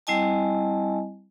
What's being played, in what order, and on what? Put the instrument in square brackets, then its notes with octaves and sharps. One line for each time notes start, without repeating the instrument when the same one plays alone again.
[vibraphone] G3 C4 E4 D#5 G#5 A5